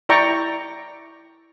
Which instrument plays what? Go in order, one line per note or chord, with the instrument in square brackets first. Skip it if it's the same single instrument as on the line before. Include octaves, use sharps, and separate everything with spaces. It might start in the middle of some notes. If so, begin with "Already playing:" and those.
[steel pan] E4 D5 G5 A#5 C#6 D6